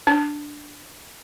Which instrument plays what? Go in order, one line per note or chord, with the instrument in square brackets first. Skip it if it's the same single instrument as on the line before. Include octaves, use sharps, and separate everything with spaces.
[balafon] D4